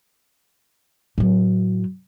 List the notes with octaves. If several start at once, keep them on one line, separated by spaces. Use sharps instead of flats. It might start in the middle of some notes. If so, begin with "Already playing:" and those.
A2 F#3